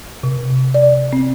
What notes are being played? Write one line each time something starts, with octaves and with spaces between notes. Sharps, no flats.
C3
D5
C4